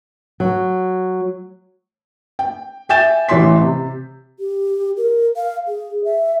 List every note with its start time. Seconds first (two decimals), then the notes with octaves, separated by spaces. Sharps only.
0.40 F#3
2.39 G5
2.89 E5 G5 G#5 G6 A6 E7
3.29 A1 E3 C#5 C6 B6
3.62 C3
4.39 G4
4.97 A#4
5.36 F5
5.68 G#4
6.04 E5